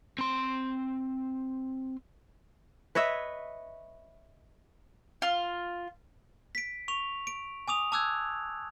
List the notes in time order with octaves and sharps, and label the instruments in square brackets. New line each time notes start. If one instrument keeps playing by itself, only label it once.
[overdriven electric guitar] C4 C6
[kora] B4 C#5 D#5 E5
[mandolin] F4
[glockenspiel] B6 D7
C#6 F7
D7
G#5 D6 D#6 F7
A5 D6 E6 F#6 G#6